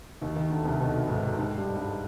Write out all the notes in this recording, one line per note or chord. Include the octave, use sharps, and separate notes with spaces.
D#2 D#3
D#2 D#3
D2 D3
C2 C3
B1 B2
G#2
G#2
G2 G3
G2 G3